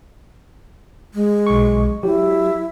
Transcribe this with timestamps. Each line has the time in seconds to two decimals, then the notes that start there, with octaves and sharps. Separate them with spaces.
1.14 G#3
1.47 B1 C#6
2.03 F#3 E4 G4